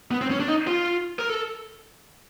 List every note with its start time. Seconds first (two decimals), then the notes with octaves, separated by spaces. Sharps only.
0.11 B3
0.21 C4
0.31 C#4
0.40 D4
0.48 D#4
0.67 F4
1.19 A#4
1.29 A4